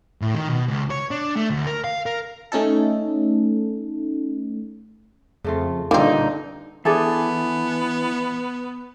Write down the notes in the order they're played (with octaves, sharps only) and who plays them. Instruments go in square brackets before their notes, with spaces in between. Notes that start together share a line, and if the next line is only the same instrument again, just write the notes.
[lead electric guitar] A2
D#3
B2
C#2
C#5
D4
A3
D2
A#4
F5
A#4
[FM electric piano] A3 C#4 D#4 A4
[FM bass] F2 [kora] C#3 A3 F4
[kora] G2 A#2 F4 [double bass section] D3 [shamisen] A#3 C4 [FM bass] D#4
[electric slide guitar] E3 [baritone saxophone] B3 [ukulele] D4 G#4 A4 [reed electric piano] E5 G#5 A5